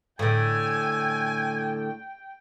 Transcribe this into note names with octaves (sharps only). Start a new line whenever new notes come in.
A2 D3 G5 G#5